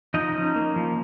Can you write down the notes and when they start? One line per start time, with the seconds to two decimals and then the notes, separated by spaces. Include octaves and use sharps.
0.14 F3 D#4 D#5
0.35 C#4
0.56 A#3
0.76 F3